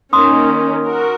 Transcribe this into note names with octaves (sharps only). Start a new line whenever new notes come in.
D#3 A#3 C#4 C6 D#6
F#4 A#4